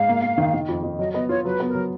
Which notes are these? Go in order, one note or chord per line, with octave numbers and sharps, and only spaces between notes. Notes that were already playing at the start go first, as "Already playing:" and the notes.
Already playing: G#2 F5
A#3
A#3
D#3
D#3
F2
F2
F#3 D#5
B3 D#5
F4 C#5
F#3 B4
B3
A#4
F#3